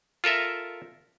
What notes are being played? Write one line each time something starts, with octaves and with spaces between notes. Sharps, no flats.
F4 A4 A#4 E5